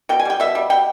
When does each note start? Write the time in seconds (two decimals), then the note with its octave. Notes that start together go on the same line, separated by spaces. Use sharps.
0.09 B2 G5
0.19 G#5
0.25 G3 G5
0.40 B2 E5
0.55 G3
0.70 B2 G5